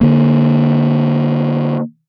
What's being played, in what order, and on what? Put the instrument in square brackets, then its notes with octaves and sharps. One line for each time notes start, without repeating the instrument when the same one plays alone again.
[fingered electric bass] D3 A#3